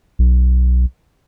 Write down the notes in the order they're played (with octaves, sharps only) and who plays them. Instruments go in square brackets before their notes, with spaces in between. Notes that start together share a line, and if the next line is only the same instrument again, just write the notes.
[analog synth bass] B1